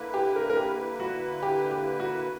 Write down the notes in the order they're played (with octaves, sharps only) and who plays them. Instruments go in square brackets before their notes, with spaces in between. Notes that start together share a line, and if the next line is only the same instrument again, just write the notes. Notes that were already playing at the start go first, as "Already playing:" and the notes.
Already playing: [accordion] D3 A#3 E4 B4
[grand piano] G4
A#4
A#4
G4
F#4
G4
G4
F#4